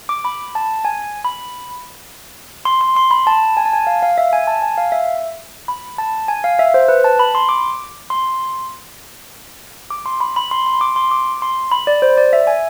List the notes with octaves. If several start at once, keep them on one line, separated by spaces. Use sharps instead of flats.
D6
B5
A5
G#5
B5
C6
C6
C6
B5
A5
G#5
A5
G#5
F5
F5
E5
G#5
A5
G#5
F5
E5
B5
A5
G#5
F5
E5
C5
B4
A5
B5
C6
D6
C6
D6
C6
B5
B5
C6
C6
D6
C6
D6
C6
B5
D5
C5
D5
E5
G#5